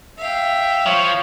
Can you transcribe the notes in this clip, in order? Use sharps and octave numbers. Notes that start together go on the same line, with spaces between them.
E5 F5 G5
F3 C#5